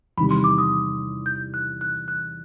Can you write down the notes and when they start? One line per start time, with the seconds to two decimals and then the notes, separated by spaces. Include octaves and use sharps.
0.17 E2 C3 D#3 G3 B5
0.31 C6
0.44 D6
0.58 D#6
1.26 G6
1.54 F#6
1.81 F#6
2.08 F#6